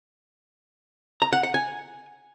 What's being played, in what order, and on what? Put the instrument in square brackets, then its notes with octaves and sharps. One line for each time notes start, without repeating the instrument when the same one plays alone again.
[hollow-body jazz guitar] A#5
F#5
F#5
G#5